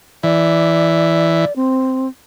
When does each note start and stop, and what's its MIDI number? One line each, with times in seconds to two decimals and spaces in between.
0.23 1.45 52
0.23 1.55 74
1.56 2.08 60